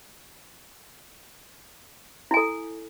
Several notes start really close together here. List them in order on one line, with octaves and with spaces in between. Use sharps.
E4 G#5 A4